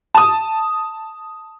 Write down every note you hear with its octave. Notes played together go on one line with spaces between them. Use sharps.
A5 D#6